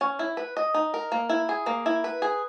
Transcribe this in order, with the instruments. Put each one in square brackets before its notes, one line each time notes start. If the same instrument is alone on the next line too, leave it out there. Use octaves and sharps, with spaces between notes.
[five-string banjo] C#4
E4
B4
D#5
D#4
A#4
A#3
E4
G#4
A#3
E4
B4
G#4